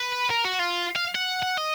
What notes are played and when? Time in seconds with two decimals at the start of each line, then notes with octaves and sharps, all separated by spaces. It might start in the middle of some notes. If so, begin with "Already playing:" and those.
Already playing: B4
0.30 A#4
0.44 F#4
0.59 F4
0.96 F5
1.15 F#5
1.43 F#5
1.58 D#5